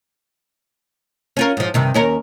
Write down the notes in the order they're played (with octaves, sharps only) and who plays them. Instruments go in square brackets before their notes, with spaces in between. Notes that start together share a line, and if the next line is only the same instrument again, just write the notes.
[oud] C#4 F4 A#4
G#2 F3
G2 C3 D#3
D#2 C#4 A#4